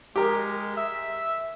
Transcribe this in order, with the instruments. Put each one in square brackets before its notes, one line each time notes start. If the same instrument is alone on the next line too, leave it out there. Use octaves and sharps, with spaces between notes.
[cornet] G#3 [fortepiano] G4 A#4
[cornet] E5